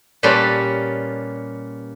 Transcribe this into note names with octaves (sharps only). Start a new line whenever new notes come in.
A#2 G3 C#4 B4 A5 C6